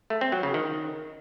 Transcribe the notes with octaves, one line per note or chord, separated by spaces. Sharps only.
A3
C4
F#3
C#3
D#3